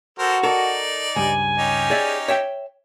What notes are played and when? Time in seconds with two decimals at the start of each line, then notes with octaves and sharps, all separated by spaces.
0.19 F#4 A4 A#4 C5
0.43 D#4 A4 A#4 D5
1.16 C#2 G2 G3 G#5
1.58 C#4 D#4 G4
1.90 G#4 D5 E5
2.28 C#5 E5 G5